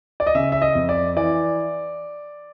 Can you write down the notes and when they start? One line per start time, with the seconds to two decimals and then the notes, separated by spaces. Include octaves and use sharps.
0.20 D5
0.27 D#5
0.35 C#3 E5
0.52 E5
0.62 D#5
0.75 F2
0.89 D5
1.17 E3 D5